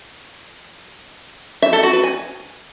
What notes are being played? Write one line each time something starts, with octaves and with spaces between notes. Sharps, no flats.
E5
A4
F#4
B4
G#5